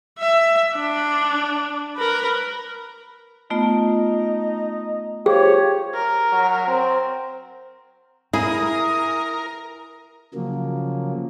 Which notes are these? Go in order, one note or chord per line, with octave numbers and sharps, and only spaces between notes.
E5
D4
A#4 B4
A3 B3 D#4 F4
F3 G4 G#4 C#5
A#4
F#3
C4
E4 G#4 A#4 D#6
C#3 F3 F#3 A#3